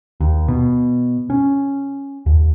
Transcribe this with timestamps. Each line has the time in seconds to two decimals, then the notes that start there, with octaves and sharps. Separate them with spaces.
0.20 D#2
0.48 B2
1.30 C#4
2.26 D#2